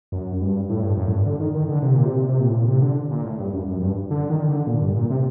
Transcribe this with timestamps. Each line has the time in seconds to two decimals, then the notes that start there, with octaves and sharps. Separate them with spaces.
0.12 F#2
0.41 G2
0.70 A2
0.83 G2
0.97 F#2
1.07 A2
1.12 G2
1.26 D3
1.40 D#3
1.55 D#3
1.69 D3
1.82 C3
1.95 A#2
2.05 C3
2.29 C3
2.40 A#2
2.49 A2
2.54 A#2
2.68 C3
2.82 D3
3.11 A#2
3.25 A2
3.39 G2
3.53 F#2
3.68 F#2
3.82 G2
4.11 D3
4.30 D#3
4.49 D3
4.67 A#2
4.82 G2
4.96 A#2
5.11 C3